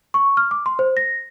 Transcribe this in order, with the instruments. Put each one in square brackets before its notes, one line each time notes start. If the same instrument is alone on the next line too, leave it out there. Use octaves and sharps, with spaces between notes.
[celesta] C#6
F6
D6
C6
C5
A#6